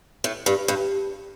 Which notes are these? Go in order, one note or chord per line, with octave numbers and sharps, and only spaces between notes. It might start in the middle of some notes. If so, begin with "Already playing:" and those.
A2
G2
G2